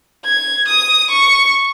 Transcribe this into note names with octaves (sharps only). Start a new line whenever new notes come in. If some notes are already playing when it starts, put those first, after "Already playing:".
G#6
D#6
C#6